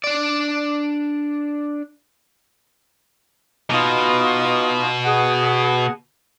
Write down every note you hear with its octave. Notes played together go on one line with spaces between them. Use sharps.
D4 D5
B2 D#4 F4 D#6
G#4 F#5